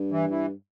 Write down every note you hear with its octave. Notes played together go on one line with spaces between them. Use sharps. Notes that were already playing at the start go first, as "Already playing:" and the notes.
Already playing: G2
E3
E3